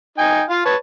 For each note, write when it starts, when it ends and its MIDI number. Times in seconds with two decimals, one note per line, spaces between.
0.18 0.42 63
0.18 0.42 79
0.18 0.42 80
0.50 0.62 65
0.50 0.62 77
0.66 0.75 71
0.66 0.75 73
0.66 0.75 81